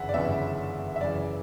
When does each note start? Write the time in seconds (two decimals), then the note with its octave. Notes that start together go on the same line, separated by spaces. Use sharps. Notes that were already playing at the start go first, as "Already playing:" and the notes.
Already playing: G1 F#2 C#3 E3 E5 F#5
0.09 D5
0.14 G1 F#2 C#3 E3 B3 E5
0.96 E5
1.01 F#2 C#3 E3 D5